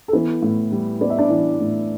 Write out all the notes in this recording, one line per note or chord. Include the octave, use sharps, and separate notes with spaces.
A4
E3 B3 B4
A2
G3
B3 D5
E5
D4 D5
E3
A2